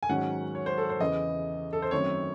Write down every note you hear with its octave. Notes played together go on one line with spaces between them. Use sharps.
G#5
G#2 D#3 F#3 C#4 F#5
C#5
C5
A4
C5
E2 C#3 E3 D#5
A4
C5
F#2 D#3 A3 C4 C#5